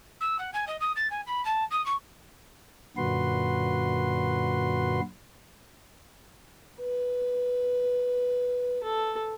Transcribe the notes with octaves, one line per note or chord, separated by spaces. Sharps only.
E6
F#5
G#5
D#5
D#6
A6
G#5
B5
A5
D#6
C#6
F#2 A#2 D3 F#4 B4 C6
B4
A4